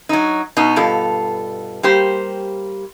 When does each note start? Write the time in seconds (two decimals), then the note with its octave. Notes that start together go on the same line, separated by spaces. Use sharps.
0.09 F#3 D#4
0.57 B2 D#4
0.76 G2 B2 F4 A4
1.83 G3 A#3 G4 C5